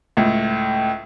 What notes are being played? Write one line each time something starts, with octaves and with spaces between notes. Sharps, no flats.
C#2 A2